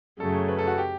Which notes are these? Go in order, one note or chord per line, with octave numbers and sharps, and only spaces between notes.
F#2 C#3 F#3 A3 A4
B4
A4
F#4
G4